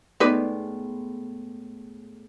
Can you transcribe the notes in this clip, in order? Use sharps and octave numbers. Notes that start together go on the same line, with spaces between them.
A2 G#3 B3 D#4 B4 D5